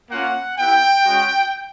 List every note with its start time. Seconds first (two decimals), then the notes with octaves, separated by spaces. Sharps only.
0.10 A#3 C#4 F4 F#5
0.58 B3 E4 G4 G5
1.05 G#3 C#4 F#4